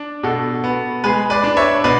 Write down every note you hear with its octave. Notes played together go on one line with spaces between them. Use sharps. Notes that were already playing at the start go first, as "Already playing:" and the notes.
Already playing: D4
B2 F#4 A4
B3
G#3 G#4 B4
B4 D5
D4
C#5 E5
B2 B4 D5